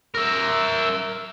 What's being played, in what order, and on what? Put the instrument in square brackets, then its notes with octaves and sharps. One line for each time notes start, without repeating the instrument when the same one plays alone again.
[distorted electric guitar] A#4 E5